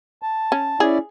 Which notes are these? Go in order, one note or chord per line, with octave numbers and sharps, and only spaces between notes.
A5
C#4
C#4 E4 G#4 D5